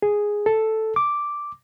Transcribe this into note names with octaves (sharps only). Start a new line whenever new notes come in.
G#4
A4
D6